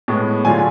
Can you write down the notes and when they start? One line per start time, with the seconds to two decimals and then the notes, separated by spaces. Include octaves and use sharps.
0.08 A2 G#3 B3
0.45 D3 F#3 A3 D4 F4 G#5